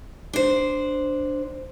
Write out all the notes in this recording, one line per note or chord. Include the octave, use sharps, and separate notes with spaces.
D4 C5